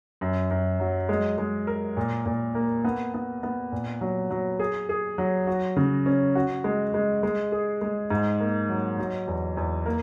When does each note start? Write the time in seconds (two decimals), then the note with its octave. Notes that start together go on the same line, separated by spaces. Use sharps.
0.21 F#2
0.51 F#2
0.80 F#3
1.09 G#3
1.38 G#3
1.67 A#4
1.97 A#2
2.26 A#2
2.55 A#3
2.85 B3
3.14 B3
3.43 B3
3.72 A#2
4.01 F#3
4.31 F#3
4.60 G#4
4.89 G#4
5.18 F#3
5.47 F#4
5.76 C#3
6.06 C#4
6.35 F#4
6.64 G#3
6.94 G#3
7.23 G#3
7.52 G#4
7.81 G#3
8.10 G#2
8.40 A#3
8.69 F#3
8.98 F#3
9.27 E2
9.57 E2
9.86 A#3